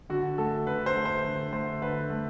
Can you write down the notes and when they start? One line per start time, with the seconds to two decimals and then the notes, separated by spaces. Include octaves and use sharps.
0.10 D3 F#4
0.38 A3 A4
0.67 D3 B4
0.86 C5
0.96 A3
1.05 C5
1.24 D3
1.53 A3 C5
1.82 D3 B4
2.10 A3